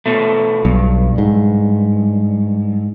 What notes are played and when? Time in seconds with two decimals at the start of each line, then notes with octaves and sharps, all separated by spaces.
0.06 B2 A3
0.65 B1 G2
1.18 G#2